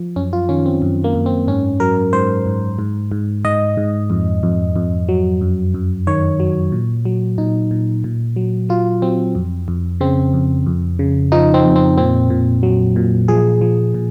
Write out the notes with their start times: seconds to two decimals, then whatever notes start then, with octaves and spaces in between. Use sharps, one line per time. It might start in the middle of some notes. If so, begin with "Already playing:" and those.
Already playing: F3
0.16 F#2 C#4
0.33 F4
0.49 D#3 C#4
0.66 C4
0.82 F#2
1.04 A#3
1.15 F#2
1.26 C4
1.47 G#2 C#4
1.80 F#3 A#4
2.13 G#2 C5
2.46 G#2
2.79 G#2
3.12 G#2
3.44 G#2 D#5
3.77 G#2
4.10 F2
4.43 F2
4.76 F2
5.09 F#3
5.41 F#2
5.74 F#2
6.07 D#3 C#5
6.40 F#3
6.72 A#2
7.05 F#3
7.38 A#2 D#4
7.71 A#2
8.04 A#2
8.36 F#3
8.69 F#3 F4
9.02 F#3 C4
9.35 F2
9.68 F2
10.00 C#3 C4
10.34 F2
10.66 F2
10.99 C#3
11.32 F3 D#4
11.54 C4
11.65 F2
11.76 C4
11.98 A#2 C4
12.30 A#2
12.63 F#3
12.96 A#2
13.28 F3 G#4
13.61 F3
13.94 A#2